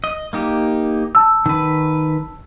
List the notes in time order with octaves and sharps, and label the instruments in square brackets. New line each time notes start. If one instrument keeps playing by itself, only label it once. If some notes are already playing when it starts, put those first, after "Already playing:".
[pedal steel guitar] D#5
A#3 D#4 G4
[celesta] A5 E6
[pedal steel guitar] D#3 B4